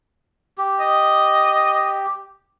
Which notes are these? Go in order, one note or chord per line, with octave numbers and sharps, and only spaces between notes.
G4
D#5